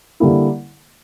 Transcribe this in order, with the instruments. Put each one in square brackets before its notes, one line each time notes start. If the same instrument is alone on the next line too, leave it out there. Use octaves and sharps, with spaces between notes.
[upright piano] D3 G3 A#3 E4